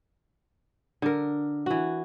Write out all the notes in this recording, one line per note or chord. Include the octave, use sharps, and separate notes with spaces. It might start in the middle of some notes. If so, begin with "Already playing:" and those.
D3 A#4
E3 F#4